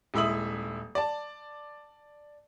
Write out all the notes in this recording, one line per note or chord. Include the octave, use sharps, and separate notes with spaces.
D#1 G#3 E4 E5 D#6 F#7
D5 A5